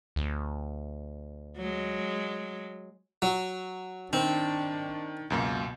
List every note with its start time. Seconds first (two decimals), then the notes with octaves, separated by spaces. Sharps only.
0.16 D2
1.57 F#3 G#3
3.22 F#3
4.13 D#3 C4 D4
5.30 C#2 F#2 B2 A#3